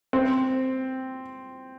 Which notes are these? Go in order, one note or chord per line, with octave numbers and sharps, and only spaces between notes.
C4